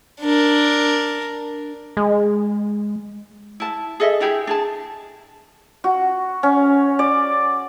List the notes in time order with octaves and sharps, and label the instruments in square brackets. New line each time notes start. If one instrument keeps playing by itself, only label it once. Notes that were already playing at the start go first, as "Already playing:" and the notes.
[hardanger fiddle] D4 A#4
[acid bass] G#3
[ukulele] E4 A5
G#4 A4 D#5 E5
D4 E4 G4 G#4
D4 G#4 A5
[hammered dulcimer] F#4
C#4
D5